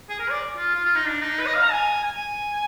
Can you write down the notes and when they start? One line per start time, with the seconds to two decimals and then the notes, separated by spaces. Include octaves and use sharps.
0.09 G#4
0.20 A#4
0.31 D5
0.57 F4
0.75 F4
0.85 F4
0.95 D#4
1.06 D4
1.22 D#4
1.39 B4
1.46 D#5
1.55 F5
1.63 A#5
1.72 G#5
2.04 G#5